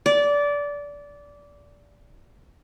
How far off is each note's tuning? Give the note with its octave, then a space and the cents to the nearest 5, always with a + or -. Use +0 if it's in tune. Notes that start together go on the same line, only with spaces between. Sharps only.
D5 -20